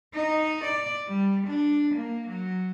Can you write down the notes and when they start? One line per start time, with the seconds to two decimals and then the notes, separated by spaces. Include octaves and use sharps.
0.14 D#4
0.64 D5
1.07 G3
1.47 D4
1.94 A#3
2.28 F#3